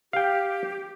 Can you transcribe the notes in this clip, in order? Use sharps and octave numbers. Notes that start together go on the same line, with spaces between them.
G4 F5 G5